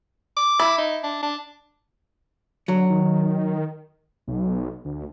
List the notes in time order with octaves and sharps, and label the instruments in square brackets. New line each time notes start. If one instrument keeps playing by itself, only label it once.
[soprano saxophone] D6
[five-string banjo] E4
[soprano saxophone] D#4
D4
D4
[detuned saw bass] D3 [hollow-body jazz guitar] F#3
[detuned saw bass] D#3
B1
D2